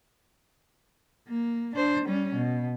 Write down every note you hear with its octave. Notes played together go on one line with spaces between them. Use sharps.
A#3
D4 C5
G3 C#4
B2